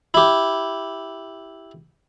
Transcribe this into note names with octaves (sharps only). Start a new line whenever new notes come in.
E4 G4